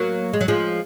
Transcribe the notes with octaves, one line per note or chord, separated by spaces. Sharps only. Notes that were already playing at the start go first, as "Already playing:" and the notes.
Already playing: F#3 A#3
G#3
F#3
F3 G#3